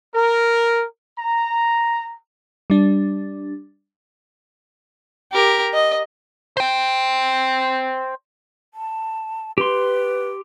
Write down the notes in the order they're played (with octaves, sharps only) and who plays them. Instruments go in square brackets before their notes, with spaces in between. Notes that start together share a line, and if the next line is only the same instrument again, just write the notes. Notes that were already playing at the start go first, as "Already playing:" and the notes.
[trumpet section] A#4
A#5
[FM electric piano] G3 D4
[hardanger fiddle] G4 A#4
D#5
[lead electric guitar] C5 G5
[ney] A5
[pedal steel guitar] G4 C6 [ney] B4